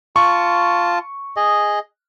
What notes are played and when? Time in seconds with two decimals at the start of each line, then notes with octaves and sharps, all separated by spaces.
0.16 F4 A5 C#6
1.37 G#4 D#5